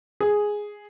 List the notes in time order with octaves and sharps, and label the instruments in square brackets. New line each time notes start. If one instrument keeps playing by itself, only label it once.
[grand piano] G#4